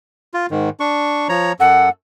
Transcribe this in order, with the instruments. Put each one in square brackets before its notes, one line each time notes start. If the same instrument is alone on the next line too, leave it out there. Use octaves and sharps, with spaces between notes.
[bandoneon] F4
G#2 D#3
D4 C#6
F3 C#5 A#5
[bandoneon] F#2 A4 [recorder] F#5